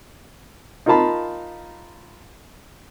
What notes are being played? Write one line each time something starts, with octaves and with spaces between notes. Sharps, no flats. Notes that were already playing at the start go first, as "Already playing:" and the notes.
D#4 F4 A#4 F5 A5 B5